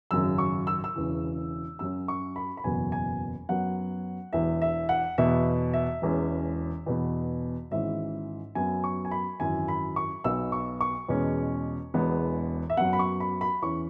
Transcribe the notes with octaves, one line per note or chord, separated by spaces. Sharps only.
G#1 F#2 C#3 F#3 E6
C#6
E6
E6
E1 E2 C#3 E3
F#2 F#3 C#4 E6
C#6
B5
B5
F#1 E2 B2 F#3 B3 G#5
G#5
F#2 F#3 B3 F#5
E1 E2 E3 E5
E5
F#5
E2 B2 B3 E5
E5
E1 E2 E3 G#3 C#4
E2 B2 B3
G#1 G#2 E3 C#4 E5
F#2 F#3 B3 G#5
C#6
G#5
B5
G#1 F#2 E3 G#5
B5
C#6
B1 B2 B3 E6
C#6
C#6
E2 B2 G#3 C#4
E1 E2 E3 G#3 B3
E5
F#2 F#3 B3 F#5
B5
C#6
B5
B5
E2 E3 C#4 C#6